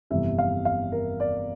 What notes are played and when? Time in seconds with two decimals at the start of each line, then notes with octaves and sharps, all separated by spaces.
0.10 G1 F2 C3 E3 E5
0.39 F5
0.65 F5
0.92 A#4
1.20 D5